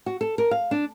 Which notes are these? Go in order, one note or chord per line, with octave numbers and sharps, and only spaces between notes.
F#4
A4
A#4
F5
D4